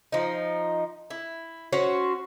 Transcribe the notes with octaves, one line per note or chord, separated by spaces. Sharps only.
F3 D#4
E4
C#4 F#4 C5